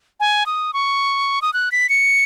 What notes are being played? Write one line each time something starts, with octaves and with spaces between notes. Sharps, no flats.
G#5
D#6
C#6
D#6
F#6
B6
C#7